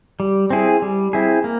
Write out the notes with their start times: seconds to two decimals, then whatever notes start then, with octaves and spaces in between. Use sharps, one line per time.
0.20 G3
0.50 C4 E4 G#4
0.82 G3
1.13 C4 E4 G#4
1.44 A#3